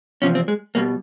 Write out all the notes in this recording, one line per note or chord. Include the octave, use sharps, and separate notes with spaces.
E2 C3 F3 C#4
C4
G#3
B2 G3 A#3